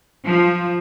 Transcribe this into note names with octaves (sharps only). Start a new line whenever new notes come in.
F3